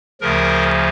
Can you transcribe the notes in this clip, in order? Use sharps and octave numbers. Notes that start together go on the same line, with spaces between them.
D2 C#3 F3 A#4